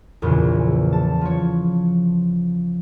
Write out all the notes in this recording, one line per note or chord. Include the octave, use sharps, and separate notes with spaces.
A#1 E2 A#2 C#3
A5
F3 C#5